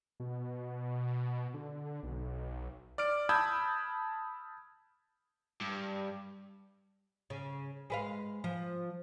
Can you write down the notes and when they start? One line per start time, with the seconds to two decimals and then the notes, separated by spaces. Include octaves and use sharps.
0.20 B2
1.54 D3
2.03 B1
2.98 D5 F6 D7
3.29 A5 B5 D#6 E6 G6 G#6
5.61 G2
7.30 C#3
7.90 G#3 B4 F5
8.44 F3